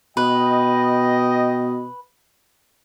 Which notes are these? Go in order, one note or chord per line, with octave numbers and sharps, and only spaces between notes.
B2 B4 D#5 G5